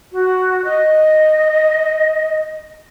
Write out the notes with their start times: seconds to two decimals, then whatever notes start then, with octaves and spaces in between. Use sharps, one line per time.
0.12 F#4
0.64 D#5